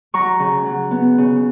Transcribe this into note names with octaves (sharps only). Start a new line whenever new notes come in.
F#3 A#5 C#6
C#3
F#3
B3
C#3